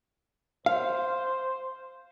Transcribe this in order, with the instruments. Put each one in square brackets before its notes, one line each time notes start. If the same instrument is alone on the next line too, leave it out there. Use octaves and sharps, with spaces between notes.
[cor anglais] C5 [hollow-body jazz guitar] F5